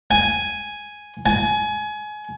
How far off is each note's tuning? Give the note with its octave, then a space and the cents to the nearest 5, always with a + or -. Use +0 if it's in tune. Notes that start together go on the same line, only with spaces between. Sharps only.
G#5 +0
G#5 +25